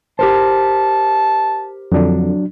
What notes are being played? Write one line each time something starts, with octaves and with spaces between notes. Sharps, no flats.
G4 A#4 C5 A5
F2 D3 F#3 D4